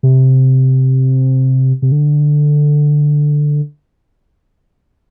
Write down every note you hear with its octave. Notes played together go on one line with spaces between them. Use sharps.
C3
C3
D3